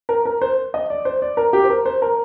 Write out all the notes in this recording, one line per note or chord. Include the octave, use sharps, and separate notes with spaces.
A#4
A#4
C5
D#5
D5
C5
D5
A#4
G4
C5
A#4
C5
A#4